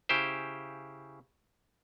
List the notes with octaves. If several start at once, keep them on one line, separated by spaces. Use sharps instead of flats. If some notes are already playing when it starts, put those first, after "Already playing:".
C#3 E4 G4 C5